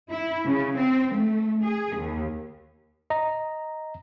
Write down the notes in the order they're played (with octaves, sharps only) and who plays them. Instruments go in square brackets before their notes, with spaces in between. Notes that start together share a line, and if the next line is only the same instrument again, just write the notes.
[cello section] E4
C#3
C4
A3
G#4
D#2
[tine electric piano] D#5 A#5